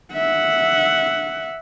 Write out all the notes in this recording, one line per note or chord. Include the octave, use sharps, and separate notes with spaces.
E5 F#5